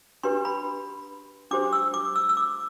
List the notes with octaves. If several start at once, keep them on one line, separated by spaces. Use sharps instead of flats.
D4 G4 B4 C6
B5
D4 G4 C5 D6
E6
D6
E6
E6
D6